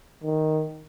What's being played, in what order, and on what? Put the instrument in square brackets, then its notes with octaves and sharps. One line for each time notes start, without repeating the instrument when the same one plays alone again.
[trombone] D#3